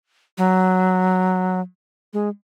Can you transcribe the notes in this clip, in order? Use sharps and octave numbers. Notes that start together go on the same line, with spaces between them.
F#3
G#3